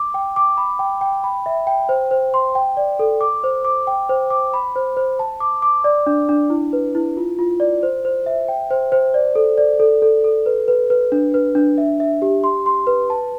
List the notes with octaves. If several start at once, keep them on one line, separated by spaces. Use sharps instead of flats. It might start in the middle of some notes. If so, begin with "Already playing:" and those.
Already playing: D6
G5
D6
B5
G5
G5
B5
E5
G5
C5
C5
C6
G5
D5
A4
D6
C5
D6
G5
C5
D6
B5
C5
C5
A5
D6
D6
D5
D4
D4
E4
B4
E4
F4
F4
D5
C5
C5
E5
G5
C5
C5
D5
A4
D5
A4
A4
A4
B4
B4
B4
D4
B4
D4
E5
E5
G4
C6
C6
B4
A5